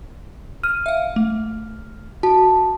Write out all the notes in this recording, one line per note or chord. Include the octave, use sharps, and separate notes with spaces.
F6 D#7
E5 F5
A3
F#4 A5